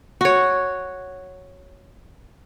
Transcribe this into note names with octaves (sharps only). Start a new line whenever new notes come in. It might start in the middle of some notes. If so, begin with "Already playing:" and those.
F#4 C#5